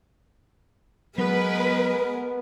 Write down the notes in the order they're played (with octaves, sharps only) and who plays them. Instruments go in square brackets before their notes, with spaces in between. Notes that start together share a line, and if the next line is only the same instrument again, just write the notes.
[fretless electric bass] F#3 [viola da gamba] G#3 A#4 [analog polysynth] B3 [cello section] B4